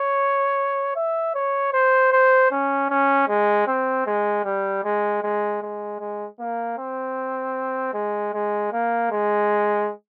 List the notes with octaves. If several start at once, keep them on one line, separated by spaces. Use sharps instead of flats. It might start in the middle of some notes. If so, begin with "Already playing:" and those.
Already playing: C#5
E5
C#5
C5
C5
C#4
C#4
G#3
C4
G#3
G3
G#3
G#3
G#3
G#3
A#3
C4
G#3
G#3
A#3
G#3